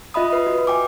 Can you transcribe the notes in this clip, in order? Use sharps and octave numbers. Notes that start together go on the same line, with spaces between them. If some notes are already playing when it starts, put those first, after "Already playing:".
F4 D#5 E5 B5 D#6
B4
F#4
G5 G#5 D6